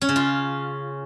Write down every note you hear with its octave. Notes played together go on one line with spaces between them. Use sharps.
C#4
C#3
F4